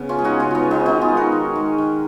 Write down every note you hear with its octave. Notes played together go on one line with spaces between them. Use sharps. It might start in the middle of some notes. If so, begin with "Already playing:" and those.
Already playing: C#3 B3
C#4 F4
G#3 G#4
D#4 F#4
C#3 C#4 F4
B3 D#4 F4
G#3
B3 D#4
D#3 D#4 F#4
F4 G#4
G#3
F#4 A#4
D#3
G#3
D#3